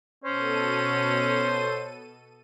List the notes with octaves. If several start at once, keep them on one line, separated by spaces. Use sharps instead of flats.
B2 C#4 A4 C5 C#5 D#7